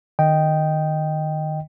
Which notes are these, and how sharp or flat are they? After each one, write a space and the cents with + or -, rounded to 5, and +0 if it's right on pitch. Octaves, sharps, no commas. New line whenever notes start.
D#3 -25 D#5 +0 G5 -5